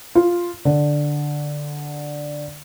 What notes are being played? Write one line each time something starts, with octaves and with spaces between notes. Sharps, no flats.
F4
D3